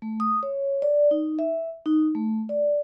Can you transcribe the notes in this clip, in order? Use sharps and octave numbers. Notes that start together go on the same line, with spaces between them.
A3
D#6
C#5
D5
D#4
E5
D#4
A3
D5